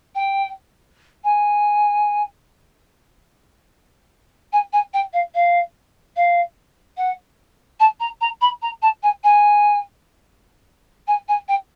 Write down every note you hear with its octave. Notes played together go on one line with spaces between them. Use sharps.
G5
G#5
G#5
G#5
G5
F5
F5
F5
F#5
A5
A#5
A#5
B5
A#5
A5
G#5
G#5
G#5
G#5
G5